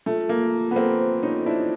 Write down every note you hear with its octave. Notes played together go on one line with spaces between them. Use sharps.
A3 F4
A#3
F4
B3 A4
A#3 C4
C5
C#4 D#4
F4
D4 E4